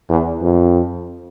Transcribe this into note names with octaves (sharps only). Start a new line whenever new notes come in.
E2
F2